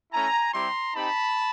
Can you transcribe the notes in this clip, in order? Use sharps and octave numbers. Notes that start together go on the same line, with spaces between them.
A3 C#4 E4 G#5 A#5
G3 C4 E4 G4 A#5 C6
C4 D#4 G4 A5 B5